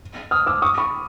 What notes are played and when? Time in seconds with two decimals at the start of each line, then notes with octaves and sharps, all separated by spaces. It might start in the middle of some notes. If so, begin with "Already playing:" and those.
0.31 D#6 F6
0.46 D6 E6
0.62 C#6 D#6
0.78 B5 C#6